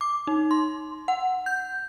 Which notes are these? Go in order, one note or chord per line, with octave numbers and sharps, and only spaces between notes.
D6
D#4
C6
F#5
G6